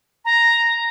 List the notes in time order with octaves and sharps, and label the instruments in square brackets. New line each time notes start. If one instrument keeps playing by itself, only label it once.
[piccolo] A#5